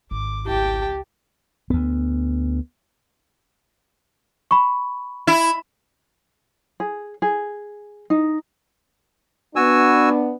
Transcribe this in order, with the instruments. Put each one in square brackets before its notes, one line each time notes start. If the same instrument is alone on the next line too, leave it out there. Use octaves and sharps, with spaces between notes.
[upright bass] G#1 [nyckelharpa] D6
[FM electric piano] G#1 E4 [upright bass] C#2 [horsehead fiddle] G4 [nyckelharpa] G5 A5
[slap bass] D2 B3
[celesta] B5 C#6
[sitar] E4
[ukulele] G#4
G#4
D#4
[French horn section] B3 D4 [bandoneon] F#4 G#5 E6